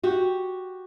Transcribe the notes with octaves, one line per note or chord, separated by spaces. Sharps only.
F#4 G4